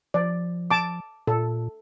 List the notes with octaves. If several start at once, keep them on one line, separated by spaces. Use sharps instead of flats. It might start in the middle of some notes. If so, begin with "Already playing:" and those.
F3 D5
A5 D6
A#2 A4